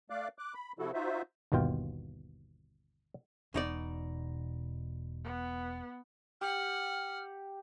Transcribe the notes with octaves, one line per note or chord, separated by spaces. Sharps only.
A3 D5 F5 D6 F#6
D6 F#6
B5
C3 F3 E4 F#4 A4
D#4 F4 F#4 C5 E5
G1 D#2 B2 F4 G5
E1 B2 D#4 D5
B3
G4 F#5 F6